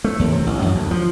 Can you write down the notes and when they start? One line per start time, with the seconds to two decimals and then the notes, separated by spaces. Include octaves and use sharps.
0.04 A3
0.19 D#2
0.32 C3
0.47 A1
0.62 F#2
0.75 D2
0.91 F3